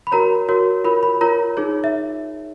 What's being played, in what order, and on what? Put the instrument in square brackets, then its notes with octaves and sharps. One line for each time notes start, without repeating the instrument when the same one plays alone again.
[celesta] B5
F#4 A#4 C#5 A#5
F#4 A#4 C#5
F4 A#4 C#5 B5
B5
F4 A#4 C#5 A#5
D#4 G#4 C#5
E5